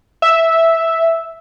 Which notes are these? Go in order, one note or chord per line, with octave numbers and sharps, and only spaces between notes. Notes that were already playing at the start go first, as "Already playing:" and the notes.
E5